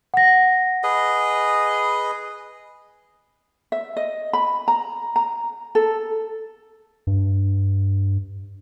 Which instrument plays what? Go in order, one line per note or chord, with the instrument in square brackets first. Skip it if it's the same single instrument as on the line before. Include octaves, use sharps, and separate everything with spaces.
[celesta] F#5 A#6
[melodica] G#4 B4 D#5
[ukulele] E5
D#5
B5
A#5
A#5
A4
[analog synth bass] G2